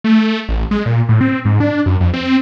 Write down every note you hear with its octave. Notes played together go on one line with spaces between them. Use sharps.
A3
A1
G#3
A#2
A2
C4
G#2
D4
F#2
F2
C4